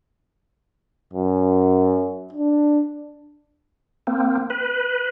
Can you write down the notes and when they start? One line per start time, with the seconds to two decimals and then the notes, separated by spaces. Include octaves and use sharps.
1.13 F#2
2.33 D4
4.07 A#3 C4
4.50 B4